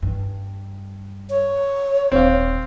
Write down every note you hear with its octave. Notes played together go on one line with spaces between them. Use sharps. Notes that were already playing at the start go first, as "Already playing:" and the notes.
G2
C#5
D#1 C4 F5